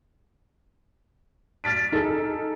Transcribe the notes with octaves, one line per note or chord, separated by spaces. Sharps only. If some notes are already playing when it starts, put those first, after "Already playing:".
F6 A6 B6 D7
D#4 G#4 A4